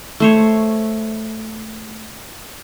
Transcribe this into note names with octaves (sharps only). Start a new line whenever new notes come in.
A3 C5 C#5